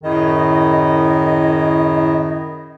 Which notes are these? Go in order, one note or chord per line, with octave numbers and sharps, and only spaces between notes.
F#2 A2 D#3 E4 G#4 D#5